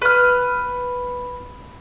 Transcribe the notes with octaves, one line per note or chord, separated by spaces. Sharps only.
B4 F6